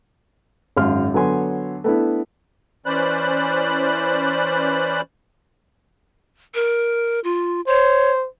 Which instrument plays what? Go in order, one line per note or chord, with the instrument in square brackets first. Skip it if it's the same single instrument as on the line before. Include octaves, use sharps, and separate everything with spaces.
[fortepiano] G#1 F#2 G#3 F5 C6 F6
D3 F#3 B3 C#5 G#5 C6
A3 B3 D4 E4
[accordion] E3 C#4 C5 D5 B5 F#6
[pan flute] A#4
F4
[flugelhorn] C5 [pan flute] C#5